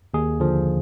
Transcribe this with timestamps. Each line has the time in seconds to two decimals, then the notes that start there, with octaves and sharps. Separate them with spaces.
0.14 D#2 G#4
0.40 D3 F3